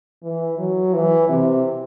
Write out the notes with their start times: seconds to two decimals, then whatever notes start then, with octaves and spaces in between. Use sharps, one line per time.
0.23 E3
0.58 F#3
0.93 E3
1.29 C3